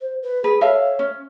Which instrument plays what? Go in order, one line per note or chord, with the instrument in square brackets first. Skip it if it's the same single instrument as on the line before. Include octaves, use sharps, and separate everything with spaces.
[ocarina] C5
B4
[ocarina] G#4 [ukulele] B4
[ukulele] A4 E5 F5 [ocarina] C#5
[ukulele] C#4